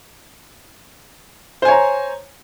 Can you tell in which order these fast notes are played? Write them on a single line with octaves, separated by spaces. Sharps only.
C5 G#5 C#5 A#5